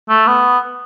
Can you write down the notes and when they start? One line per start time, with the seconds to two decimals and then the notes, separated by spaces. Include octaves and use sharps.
0.09 A3
0.27 B3